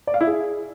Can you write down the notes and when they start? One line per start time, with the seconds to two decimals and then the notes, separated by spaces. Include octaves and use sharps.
0.07 D5
0.14 F5
0.21 E4
0.27 G#4